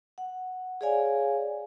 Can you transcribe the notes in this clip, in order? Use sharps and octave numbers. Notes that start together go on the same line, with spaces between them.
F#5
G#4 C#5 D5 F5 G#5